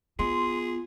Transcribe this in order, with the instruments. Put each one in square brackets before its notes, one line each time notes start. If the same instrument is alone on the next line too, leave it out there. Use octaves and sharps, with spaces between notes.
[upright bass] B3 [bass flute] F4 [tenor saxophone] G#4 [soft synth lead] C6